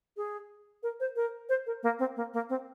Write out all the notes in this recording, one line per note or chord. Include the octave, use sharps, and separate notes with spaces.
G#4
A#4
C5
A#4
C5
A#4
A#3
C4
A#3
A#3
C4